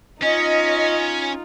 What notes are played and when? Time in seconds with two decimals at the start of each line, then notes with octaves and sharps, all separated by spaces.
0.22 C#4 D#4 F4 D#5